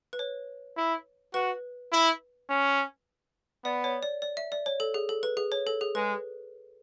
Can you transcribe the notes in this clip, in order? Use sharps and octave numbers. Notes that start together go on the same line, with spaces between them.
B4
C#5
E4
F#4 B4
E4
C#4
B3 D5
C#5
D5
D5
E5
D5
C#5
A4
G#4
A4
B4
G#4
C#5
A4
G#4
G#3 B4